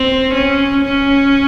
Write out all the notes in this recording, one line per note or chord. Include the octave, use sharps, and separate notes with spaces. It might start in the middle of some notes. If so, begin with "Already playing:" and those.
Already playing: C4
C#4
C#4